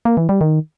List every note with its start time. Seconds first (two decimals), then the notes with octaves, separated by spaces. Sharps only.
0.05 A#3
0.17 E3
0.29 G3
0.41 D#3